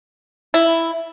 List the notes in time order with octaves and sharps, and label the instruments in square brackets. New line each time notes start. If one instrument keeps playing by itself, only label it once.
[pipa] E4